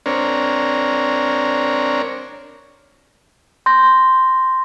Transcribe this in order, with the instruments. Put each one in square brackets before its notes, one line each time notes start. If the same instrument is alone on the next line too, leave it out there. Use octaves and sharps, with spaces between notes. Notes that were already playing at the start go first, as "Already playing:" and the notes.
[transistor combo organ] C4 D4 A#4 C#5
[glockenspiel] C6 G6 A#6